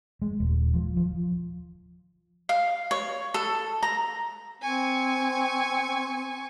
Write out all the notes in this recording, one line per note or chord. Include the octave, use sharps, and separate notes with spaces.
G#3
D#1
F3
F3
F5
C#5
A4
A#5
C4 G#5 C#6